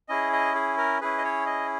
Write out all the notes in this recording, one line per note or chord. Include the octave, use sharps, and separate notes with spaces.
C#4 E4 G#4 D#5
D#5
G#4
A#4
C#4 E4 G#4 B4
D#5
C#5
D#5